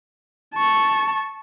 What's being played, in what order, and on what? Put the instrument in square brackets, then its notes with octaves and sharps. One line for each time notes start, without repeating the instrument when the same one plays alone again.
[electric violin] A5 C#6